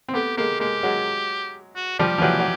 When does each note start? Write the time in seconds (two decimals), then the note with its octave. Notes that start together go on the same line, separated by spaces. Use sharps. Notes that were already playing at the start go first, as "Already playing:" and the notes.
0.09 C4
0.14 A3 B3 G4
0.37 G#3 A#3 G4
0.60 G#3 A#3 G4
0.83 F#3 G#3
1.76 F#4
1.99 F3 G3 G4
2.18 F3
2.22 E3 F#3
2.40 F#3